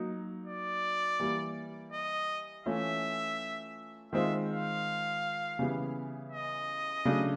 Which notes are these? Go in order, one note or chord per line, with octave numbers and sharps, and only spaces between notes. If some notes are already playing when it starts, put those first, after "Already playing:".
Already playing: F#3 A#3 D#4
D5
E3 G3 A#3
D#5
E3 A3 C#4 F4 E5
D#3 G#3 C4 F4 E5
F5
C#3 E3 G3 B3 E4
D#5
C#3 F#3 A3 D4